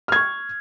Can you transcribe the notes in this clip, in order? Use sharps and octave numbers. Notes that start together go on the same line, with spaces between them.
C#6 F6 G#6